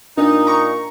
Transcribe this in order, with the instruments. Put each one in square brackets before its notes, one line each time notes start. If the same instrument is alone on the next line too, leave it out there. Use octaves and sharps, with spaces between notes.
[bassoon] A#2 [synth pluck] D4 [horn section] D#4
[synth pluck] A#5 C#6